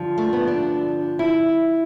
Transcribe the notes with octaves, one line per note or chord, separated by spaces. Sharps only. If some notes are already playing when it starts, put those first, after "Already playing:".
Already playing: G2 D3 F3
A3
B3
D4
E4